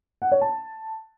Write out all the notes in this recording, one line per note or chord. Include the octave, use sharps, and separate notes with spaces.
F#5
C#5
A5